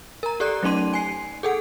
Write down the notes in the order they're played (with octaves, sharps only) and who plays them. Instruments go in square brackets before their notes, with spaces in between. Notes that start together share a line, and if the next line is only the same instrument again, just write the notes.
[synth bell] A#4 A#5
G4 A4 D5 F#6
F#3 A3 C#4 D#4 C6 D#7
G#5 C7
G#4 A4 F#5